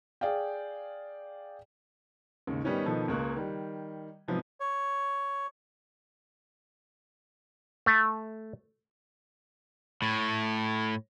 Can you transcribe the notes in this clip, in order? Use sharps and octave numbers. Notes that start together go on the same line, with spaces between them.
G#4 D5 F5 G5
D#2 G#2 C#3
D#3 G3 B3 C#4 D#4
B2 D#3 F3 B3 A4
C#2 C#3 A#3 C#6 F#6
D#3 G3
G#2 C3 F3 F#3 B3
C#5
A3
A2